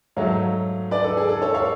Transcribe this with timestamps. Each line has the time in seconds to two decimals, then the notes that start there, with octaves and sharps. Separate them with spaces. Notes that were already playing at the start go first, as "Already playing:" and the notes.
0.17 G#2 F#3 A3 C#5 F5
0.91 B4 D5
1.04 A4
1.17 G#4
1.29 A4
1.42 A4 C#5
1.54 C#5 F5